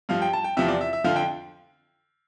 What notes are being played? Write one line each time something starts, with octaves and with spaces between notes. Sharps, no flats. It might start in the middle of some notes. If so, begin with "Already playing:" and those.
G2 F3 F5
G5
A5
G5
E2 C3 F3 E5
D5
E5
E5
F2 D3 F3 F5
G5